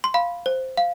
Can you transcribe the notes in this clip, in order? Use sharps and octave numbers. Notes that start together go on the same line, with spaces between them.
C6
F5 B5
C5
F5